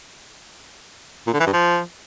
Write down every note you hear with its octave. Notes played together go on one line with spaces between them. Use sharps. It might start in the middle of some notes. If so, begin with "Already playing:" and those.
A#2
D3
E3
G2
F3